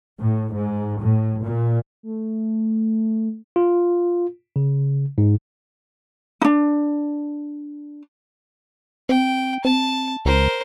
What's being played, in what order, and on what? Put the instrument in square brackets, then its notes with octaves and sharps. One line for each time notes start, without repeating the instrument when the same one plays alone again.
[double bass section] A2
G#2
A2
A#2
[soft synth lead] A3
[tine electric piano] F4
C#3
G#2
[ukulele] D4 D#4
[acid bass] C4 [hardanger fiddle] G5
[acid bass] C4 [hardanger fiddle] A5
[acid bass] C#2 [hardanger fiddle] A#4 C5